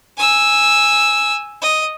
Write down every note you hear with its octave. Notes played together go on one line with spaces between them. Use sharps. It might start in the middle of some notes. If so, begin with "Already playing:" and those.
G#5 E6
D#5